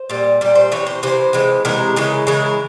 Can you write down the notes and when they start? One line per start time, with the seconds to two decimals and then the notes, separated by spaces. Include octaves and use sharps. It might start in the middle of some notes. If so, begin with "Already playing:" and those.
Already playing: C5
0.10 A#2 G3
0.41 A#2 G3
0.55 C5
0.72 C3 E3 C#5
0.87 C5
1.03 C3 E3 C5
1.33 C3 E3 G#3
1.65 C3 E3 G#3 A#4
1.96 C#3 E3 G#3
2.27 C#3 E3 G#3 A#4